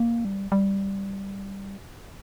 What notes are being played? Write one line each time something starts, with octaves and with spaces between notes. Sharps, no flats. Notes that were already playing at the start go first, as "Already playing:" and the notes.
Already playing: A#3
G3
G3